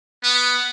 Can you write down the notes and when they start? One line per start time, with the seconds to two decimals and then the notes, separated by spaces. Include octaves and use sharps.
0.24 B3